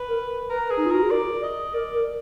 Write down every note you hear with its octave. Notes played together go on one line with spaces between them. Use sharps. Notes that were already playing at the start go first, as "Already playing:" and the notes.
Already playing: B4
A#4
A#4 B4
G#4
D#4
F4
F#4 A#4
G#4
A#4 D5
D#5
A#4 D5
A#4